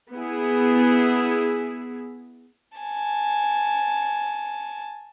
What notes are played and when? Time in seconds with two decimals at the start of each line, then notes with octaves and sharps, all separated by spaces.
0.12 B3 E4 G#4
2.78 G#5 A5